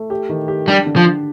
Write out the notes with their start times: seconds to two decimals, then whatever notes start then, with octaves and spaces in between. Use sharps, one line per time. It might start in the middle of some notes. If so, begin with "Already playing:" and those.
Already playing: A3
0.10 G4
0.29 D#3
0.48 G4
0.67 G3 D4
0.86 D3
0.96 F3
1.05 D3